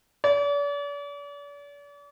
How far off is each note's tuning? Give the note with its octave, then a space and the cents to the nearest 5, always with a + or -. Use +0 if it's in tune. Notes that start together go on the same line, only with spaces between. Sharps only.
D5 -40